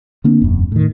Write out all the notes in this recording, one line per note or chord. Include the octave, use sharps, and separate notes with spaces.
D3 A#3 C4 D4
E1 F#2
A2 D#3